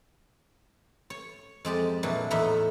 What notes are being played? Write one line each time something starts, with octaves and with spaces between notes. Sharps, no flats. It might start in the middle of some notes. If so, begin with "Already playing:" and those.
C#5
F2 G#3 G4 A5
A#2 E3 F#3 D4
E2 A2 D#4 E4 E5 A#5